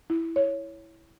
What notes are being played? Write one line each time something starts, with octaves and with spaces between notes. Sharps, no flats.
E4
C#5